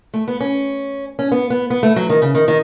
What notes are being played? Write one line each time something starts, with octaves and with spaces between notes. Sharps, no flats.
A3
B3
C#4
C#4
B3
B3
B3
A3
F#3
D#3
C#3
D#3
D#3